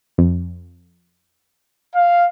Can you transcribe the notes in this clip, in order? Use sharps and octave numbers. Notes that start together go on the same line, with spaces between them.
F2
F5